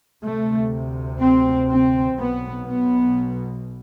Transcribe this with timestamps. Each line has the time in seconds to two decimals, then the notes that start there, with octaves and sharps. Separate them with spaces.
0.23 D2 C3 A3
1.20 C4
1.69 C4
2.18 B1 B2 B3
2.66 B3